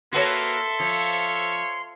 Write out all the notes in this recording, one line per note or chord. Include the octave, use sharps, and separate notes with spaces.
A#3 F#4 A4 B4 C#5 E5 C6
F3 C#5